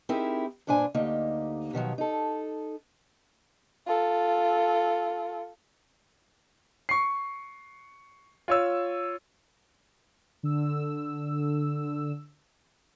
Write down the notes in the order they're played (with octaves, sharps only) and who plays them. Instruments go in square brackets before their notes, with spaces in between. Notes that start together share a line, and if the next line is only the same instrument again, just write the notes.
[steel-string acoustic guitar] C4 D#4 E4 G4 G#4 A#4
G2 A#2 D4 C5 G#5
D2 A#3 D#4 G4 D#5
B2 D#3 F3 F#3
D#4 A4
[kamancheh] F4 A4
[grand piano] C#6 C7
F4 C#5 E6
[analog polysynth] D3 E6